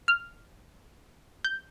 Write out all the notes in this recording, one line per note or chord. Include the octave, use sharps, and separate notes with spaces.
F6
G6